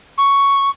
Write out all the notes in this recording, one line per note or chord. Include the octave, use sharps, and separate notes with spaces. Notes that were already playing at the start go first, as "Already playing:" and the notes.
C#6